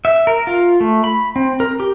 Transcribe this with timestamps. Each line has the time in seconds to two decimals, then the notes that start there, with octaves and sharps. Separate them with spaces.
0.05 E5
0.27 A#4
0.47 F4
0.80 A3
1.04 B5
1.36 C4
1.60 A#4
1.80 G4